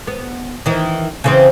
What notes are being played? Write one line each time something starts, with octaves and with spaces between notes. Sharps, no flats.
B3
D#3 E3
C#3 E3 C4